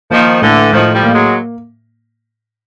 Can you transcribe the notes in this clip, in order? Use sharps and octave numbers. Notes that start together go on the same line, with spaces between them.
D#3 F3 A#3
A2 D3 E3
A2 D#3 F3
F3 G3
A#3
F#3 G#3